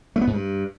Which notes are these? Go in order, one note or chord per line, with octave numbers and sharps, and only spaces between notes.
A3
B3
G#2
G2